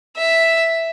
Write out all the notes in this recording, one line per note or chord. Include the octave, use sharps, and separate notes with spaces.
E5